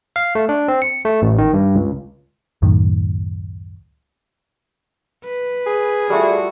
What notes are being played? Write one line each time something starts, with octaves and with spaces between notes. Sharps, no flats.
F5
A3
D4
C4
C#7
A3
A1
D#3
G2
C#2
C#2 F#2 A2 D#3
B4
G#4
G3 A3 F4 F#4